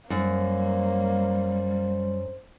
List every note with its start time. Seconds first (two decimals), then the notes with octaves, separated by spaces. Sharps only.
0.10 F#2 G3 A#3 C5